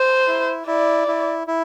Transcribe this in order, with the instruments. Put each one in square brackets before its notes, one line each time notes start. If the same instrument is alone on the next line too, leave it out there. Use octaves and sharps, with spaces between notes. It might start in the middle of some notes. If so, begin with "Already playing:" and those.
Already playing: [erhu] C5
[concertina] E4
[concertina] E4 [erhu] D5
[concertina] E4
E4